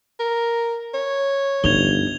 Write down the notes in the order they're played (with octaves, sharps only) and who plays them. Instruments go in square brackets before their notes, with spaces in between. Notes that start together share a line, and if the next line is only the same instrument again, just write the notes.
[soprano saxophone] A#4
C#5
[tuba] G1 [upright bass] F3 D#4 [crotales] G#6 F7 G7